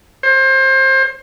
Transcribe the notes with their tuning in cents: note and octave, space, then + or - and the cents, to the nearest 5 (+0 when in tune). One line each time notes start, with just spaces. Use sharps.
C5 +30